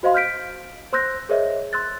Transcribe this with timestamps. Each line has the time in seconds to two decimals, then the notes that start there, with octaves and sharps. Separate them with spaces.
0.03 F#4 C5 D#5 F5 C6
0.14 F6 G6 B6 D7
0.93 C5 C6 E6 F#6 G6 A#6
1.29 G#4 A#4 C5 C#5 D#5 E5
1.73 C6 E6 F#6 A6